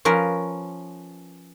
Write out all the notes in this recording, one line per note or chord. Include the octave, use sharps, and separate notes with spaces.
F3 C#4 A#4 B4